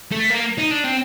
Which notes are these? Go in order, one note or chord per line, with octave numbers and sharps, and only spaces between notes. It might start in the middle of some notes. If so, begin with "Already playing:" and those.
A3
A#3
D#4
D4
C4